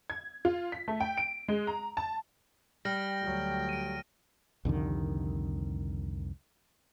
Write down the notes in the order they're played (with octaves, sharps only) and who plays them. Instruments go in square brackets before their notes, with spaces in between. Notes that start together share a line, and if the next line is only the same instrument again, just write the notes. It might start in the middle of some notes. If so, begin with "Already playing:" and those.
[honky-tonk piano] G#6
F4
B6
A3
G5
D7
G#3
A#5
A5
[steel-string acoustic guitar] G3 [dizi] G5 [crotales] F6 A#6
[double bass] D2 F#3
[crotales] D7 D#7
[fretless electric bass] C2 F2 D3 D#3